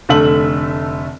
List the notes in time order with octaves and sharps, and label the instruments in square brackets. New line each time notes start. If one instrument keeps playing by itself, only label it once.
[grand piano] F1 D3 A3 E5 F#7